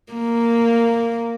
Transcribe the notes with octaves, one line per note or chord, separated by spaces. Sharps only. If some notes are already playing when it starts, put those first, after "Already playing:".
A#3